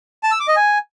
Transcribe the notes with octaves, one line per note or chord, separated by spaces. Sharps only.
A5
E6
D6
D#5
G#5